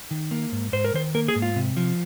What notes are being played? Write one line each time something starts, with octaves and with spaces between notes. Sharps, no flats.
D#3
A#3
G#2
G#2 C5
A#4
D#3 C5
A#3 A#4
G#4
G#2
F4
C3
F3